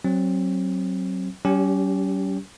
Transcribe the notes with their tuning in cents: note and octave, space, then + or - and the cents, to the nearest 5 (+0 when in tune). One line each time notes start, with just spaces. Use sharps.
F#3 +20 C4 +30
G3 -45 C#4 +25 G4 +0